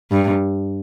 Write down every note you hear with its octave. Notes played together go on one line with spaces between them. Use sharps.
G2